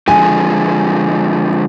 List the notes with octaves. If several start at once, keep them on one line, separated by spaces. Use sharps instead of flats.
D3 F3 G#3 G#5